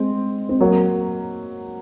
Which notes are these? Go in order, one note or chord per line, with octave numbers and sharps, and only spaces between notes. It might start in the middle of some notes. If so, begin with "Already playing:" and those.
Already playing: G#3 C4
C4
F#3 A#3